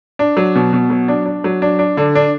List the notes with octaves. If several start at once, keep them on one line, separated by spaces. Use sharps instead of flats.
D4
F#3
B2
B2
F#3
D4
D4
F#3
D4
D4
D3
D4